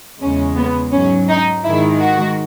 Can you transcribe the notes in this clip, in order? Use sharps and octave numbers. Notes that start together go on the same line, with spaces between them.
E2 C#3 G#3 C#4
B3
G#2 F#3 C#4
D#4
G#2 D#3 G#3 E4
F#4